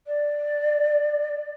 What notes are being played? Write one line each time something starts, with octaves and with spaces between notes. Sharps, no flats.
D5